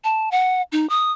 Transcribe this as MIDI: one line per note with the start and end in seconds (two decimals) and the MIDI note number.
0.04 0.29 81
0.31 0.62 78
0.72 0.88 63
0.89 1.12 87